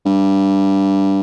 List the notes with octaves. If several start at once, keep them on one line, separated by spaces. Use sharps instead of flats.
G2